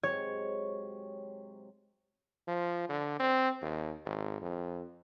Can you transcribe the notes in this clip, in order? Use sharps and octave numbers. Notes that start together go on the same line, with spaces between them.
G#2 C3 F#3 C#5
F3
D3
C4
D#2
G#1
F2